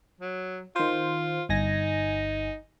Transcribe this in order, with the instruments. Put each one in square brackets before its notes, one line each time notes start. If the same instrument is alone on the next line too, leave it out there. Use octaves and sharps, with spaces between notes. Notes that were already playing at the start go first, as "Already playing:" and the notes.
[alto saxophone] F#3
[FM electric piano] D#3 C5 [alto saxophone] F4
[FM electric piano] G1 G#5 A#6 [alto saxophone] D#4